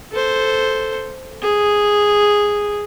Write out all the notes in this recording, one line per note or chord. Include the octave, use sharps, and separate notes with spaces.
A4 C5
G#4